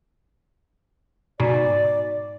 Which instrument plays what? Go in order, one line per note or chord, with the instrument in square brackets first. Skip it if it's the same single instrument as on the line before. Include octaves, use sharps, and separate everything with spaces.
[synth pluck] G#2 B2 [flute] D5